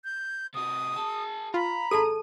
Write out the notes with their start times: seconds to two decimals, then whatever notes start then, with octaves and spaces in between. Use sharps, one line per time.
0.04 G6
0.54 C3 F#4 D#6
0.97 G#4 A5
1.54 F4 A#5 B5
1.91 A1 G#4 A4 A5 D#7